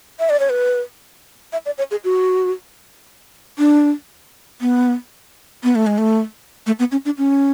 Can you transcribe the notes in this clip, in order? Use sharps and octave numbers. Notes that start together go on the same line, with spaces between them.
E5
D5
C#5
B4
E5
D5
C#5
G#4
F#4
D4
B3
B3
A3
G#3
A3
A3
B3
C#4
D4
C#4